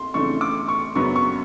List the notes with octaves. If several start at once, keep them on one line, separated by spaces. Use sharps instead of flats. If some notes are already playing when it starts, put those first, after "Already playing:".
Already playing: C6
F2 C#3 E3 A3 D4 C#6
D6
C#6
F#2 C#3 F#3 B3 D4 C#6
C#6